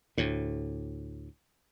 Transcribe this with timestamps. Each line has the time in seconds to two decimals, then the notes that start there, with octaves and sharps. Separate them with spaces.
0.18 D2 A2